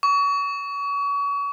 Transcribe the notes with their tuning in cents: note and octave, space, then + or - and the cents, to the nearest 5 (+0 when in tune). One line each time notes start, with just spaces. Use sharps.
C#6 +35